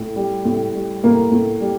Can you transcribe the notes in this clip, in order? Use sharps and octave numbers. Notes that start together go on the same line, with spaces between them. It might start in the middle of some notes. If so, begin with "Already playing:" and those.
Already playing: A2
G3
A2
G3
A2 A#3
A2
G3